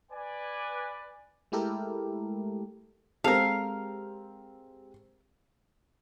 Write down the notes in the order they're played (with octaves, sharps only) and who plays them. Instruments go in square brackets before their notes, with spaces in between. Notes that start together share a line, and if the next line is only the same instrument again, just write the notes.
[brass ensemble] B4 D5 G#5
[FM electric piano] G#3 A3 E4 G4 A4 A#4
[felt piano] G#3 C4 G4 [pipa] A4 A#4 [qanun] F5